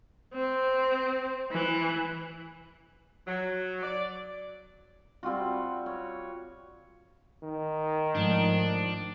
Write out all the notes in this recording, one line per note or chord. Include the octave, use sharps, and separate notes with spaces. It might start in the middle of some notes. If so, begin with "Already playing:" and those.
C4
E3
F#3
D5
G3 C4 F4 F#4
C#5
D#3
G#2 F3 A3 D4